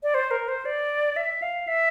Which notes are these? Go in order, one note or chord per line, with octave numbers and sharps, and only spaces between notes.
D5
C5
A#4
C5
D5
E5
F5
E5